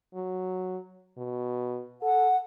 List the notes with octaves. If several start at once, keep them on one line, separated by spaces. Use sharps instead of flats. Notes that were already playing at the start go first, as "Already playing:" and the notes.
F#3
B2
A4 F#5